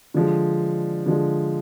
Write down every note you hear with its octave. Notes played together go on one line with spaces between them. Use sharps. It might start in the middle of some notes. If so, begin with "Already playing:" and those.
D3 F3 G#3
D3 F3 G#3